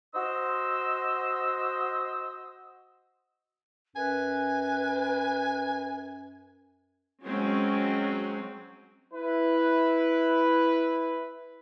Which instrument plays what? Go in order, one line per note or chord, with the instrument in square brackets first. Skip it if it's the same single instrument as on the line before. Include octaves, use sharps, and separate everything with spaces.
[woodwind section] F#4 C5 D#5 D#6 E6
[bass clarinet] F#2 [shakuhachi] B4 [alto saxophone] G#5
[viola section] F#3 G#3 C4 C#4
[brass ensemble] E4 B4